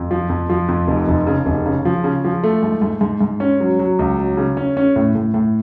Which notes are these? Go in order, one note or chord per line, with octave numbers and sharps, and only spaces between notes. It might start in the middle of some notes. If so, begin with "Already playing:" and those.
Already playing: F2
F3
F2
F3
F2
F1
F1
C#3
F1
C#3
F3
C#3
F3
A3
G#2
G#2
G#2
G#2
C#4
F#3
F#3
C#2
F#3
C#3
C#4
C#4
A2
A2
A2